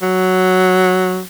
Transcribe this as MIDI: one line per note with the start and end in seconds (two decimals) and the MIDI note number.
0.02 1.20 54